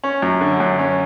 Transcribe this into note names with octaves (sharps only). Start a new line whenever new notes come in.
C#4
F#2
D3
F#2
C#4